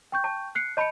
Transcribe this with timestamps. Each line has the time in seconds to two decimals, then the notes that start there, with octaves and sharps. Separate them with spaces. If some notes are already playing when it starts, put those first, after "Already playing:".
0.12 G5 C#6 G6
0.24 A5
0.55 F#6 C7 C#7
0.77 D#5 A5 B5 G6 C#7